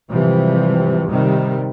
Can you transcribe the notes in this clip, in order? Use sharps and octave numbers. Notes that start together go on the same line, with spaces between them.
G#2 C3 E3 F3 G3
C3 D#3 G3